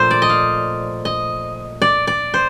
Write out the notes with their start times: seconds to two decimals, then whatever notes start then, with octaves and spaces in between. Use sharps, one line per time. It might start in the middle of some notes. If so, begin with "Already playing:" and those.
Already playing: A#2 F3 A3 C5
0.11 D5
0.22 D#5
0.29 F5
1.05 D#5
1.82 D5
2.07 D5
2.34 C5